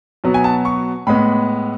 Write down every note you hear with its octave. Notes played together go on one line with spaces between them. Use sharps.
B2 F#3 B3
G#5
A5
C#6
A2 G#3 B3 B5